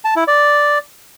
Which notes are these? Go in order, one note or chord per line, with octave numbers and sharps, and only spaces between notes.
A5
E4
D5